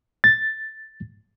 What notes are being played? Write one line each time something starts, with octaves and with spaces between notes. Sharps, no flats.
A6